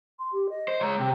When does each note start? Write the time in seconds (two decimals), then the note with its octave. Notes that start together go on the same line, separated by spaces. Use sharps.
0.19 C6
0.33 G4
0.50 D#5
0.68 C5
0.81 G#3 C#5 A#5
1.00 C3 G5